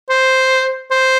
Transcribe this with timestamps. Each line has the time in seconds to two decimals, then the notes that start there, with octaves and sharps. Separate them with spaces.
0.10 C5
0.91 C5